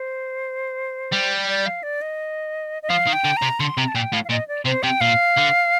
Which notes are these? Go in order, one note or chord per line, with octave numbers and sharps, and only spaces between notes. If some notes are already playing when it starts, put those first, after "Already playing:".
Already playing: C5
G3
D5
F5
D5
D#5
D#5
F3 F5
D#3
G5
D3
A#5
C3
D3 C6
C3 A#5
A5
A#2 G5
A2 F5
F5
A#2 D#5
D5
C3 C5
C3 G5
A#2 F5
D3